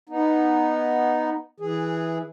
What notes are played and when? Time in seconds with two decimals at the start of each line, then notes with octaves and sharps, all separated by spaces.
0.09 B3 D#4
1.60 E3 G#4